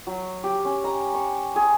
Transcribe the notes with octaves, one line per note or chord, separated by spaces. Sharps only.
F#3
G4
C#4
A#5
C#6
G#4